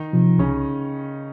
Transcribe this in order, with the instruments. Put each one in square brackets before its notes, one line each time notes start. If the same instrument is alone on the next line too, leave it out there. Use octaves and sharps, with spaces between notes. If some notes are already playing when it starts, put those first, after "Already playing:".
Already playing: [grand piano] D#3 D#4
[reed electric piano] C3 F3
[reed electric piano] C2 [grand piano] C#3 C#4